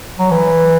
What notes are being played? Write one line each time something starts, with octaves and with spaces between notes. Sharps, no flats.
F#3
E3